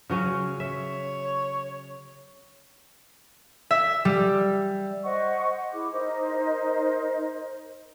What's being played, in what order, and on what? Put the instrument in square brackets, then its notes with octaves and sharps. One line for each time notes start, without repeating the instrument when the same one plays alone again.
[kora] C#3 F#3 C#4
[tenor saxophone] C#5 [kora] E5
[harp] E5
G3
[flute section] C5 D#5 F#5 C#6
E4 G#4 D6
D#4 A#4 C5 D#5